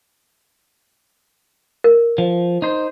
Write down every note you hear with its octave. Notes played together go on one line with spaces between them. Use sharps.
A#4
F3
D#4 C5